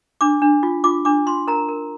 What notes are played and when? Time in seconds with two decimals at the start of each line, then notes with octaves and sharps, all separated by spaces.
0.21 D4 D6
0.42 D4
0.63 F4
0.84 F4 D6
1.05 D4 D6
1.27 F4 C6
1.47 A#4 A#5
1.69 A#4